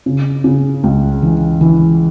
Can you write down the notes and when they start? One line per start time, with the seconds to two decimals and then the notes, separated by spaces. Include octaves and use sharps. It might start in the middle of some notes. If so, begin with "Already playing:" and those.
0.06 C#3
0.44 C#3
0.84 C#2
1.22 E3
1.61 E3